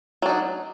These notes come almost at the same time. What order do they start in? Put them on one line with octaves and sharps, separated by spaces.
F#3 D4 D#4